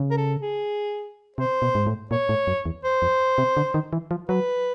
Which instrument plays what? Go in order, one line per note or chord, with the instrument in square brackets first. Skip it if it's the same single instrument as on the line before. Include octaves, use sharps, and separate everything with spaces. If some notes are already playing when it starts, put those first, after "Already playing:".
Already playing: [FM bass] C#3
[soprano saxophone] A#4
A4
G#4
[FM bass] C3 [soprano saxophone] C5
[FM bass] B2
G#2
A2
[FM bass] A#2 [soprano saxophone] C#5
[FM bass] A2
F#2
E2
[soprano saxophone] C5
[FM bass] F2
C3
D3
D#3
E3
F3
[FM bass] F#3 [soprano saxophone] B4